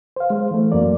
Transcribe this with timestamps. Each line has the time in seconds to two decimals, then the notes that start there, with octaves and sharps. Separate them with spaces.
0.16 C5 F5
0.30 G#3 C5
0.51 E3 A3
0.72 F#2 A#3 D5